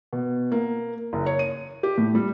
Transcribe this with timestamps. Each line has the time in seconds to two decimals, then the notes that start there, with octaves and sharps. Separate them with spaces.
0.13 B2
0.52 A#3
1.13 F#1
1.26 C#5
1.39 D#7
1.83 G4
1.98 A2
2.15 G3